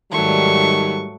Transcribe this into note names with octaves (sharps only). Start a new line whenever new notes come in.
G#2 D#3 F#3 G3 A3 C#6